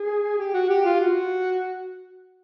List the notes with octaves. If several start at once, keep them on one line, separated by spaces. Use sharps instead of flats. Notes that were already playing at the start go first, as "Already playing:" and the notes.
Already playing: G#4
G4
F#4
G4
F4
F#4